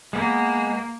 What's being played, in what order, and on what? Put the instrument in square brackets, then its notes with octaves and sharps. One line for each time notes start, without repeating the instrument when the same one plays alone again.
[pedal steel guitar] G#3 B3 [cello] A#3